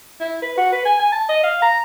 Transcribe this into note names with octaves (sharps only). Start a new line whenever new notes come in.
E4
B4
F#4
B4
G#5
G#5
A5
D#5
F5
A#5